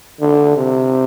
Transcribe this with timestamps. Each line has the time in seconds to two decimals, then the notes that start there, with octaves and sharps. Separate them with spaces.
0.21 D3
0.57 C3